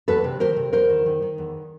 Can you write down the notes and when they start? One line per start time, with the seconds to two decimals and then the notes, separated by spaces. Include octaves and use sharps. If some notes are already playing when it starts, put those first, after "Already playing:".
0.08 E2 A4 B4
0.24 C3
0.40 D#3 A#4 C5
0.57 C3
0.73 E2 A#4 C5
0.89 D#3
1.06 D#3
1.22 D#3
1.38 E2